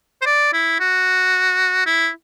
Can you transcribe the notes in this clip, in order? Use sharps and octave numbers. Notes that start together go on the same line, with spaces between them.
C5
D5
E4
F#4
E4